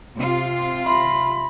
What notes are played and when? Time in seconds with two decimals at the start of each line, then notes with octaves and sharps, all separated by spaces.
0.16 C3 F4
0.86 E5 B5 C6